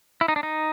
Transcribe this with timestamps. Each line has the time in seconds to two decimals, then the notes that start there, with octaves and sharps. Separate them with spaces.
0.21 E4
0.28 D#4
0.36 D4
0.43 D#4